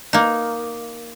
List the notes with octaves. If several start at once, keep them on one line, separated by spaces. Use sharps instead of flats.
A#3 D#4